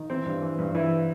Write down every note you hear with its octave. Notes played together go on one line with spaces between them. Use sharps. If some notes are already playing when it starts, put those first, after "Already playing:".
Already playing: D#3
E3 C4
G2
E3
G2
E3 E4